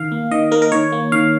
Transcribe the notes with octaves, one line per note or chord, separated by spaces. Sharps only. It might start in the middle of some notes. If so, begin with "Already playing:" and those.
Already playing: D#3 F5
A#3
D#3 D#5
A#3 A#4
A#4
D#3 C#5
A#3
D#3 F5